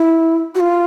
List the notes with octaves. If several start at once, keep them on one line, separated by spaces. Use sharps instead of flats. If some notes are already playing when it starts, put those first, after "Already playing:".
Already playing: E4
F#4
F4